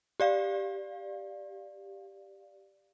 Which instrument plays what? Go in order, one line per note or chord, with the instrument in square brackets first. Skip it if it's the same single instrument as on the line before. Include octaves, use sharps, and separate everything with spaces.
[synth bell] G4 D5 F5